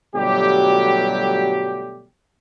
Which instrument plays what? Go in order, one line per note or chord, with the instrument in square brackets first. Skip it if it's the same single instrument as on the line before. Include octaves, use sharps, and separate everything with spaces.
[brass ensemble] G1 B2 F#3 G3 A3 G4